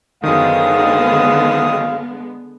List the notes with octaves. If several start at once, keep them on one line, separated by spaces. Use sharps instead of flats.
F#2 D3 D#3 G#3 B3 C4 F5 D#6